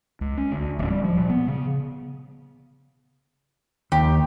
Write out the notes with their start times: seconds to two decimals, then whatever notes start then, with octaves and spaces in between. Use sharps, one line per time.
0.21 C#2
0.37 C#4
0.52 D2
0.79 D1
0.90 G3
1.04 F3
1.17 A#2
1.30 B3
1.48 C#3
3.92 D#2 G4